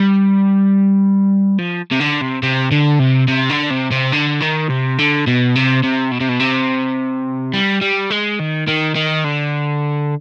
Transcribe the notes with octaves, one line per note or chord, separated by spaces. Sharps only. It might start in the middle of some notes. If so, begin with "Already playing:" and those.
Already playing: G3
F3
C3
D3
C3
C3
D3
C3
C3
D3
C3
C3
D3
D#3
C3
D3
B2
C3
C3
B2
C3
B2
C3
G3
G3
G#3
D#3
D#3
D#3
D3